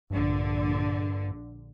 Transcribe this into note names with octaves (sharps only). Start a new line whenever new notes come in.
A#1 G2 D3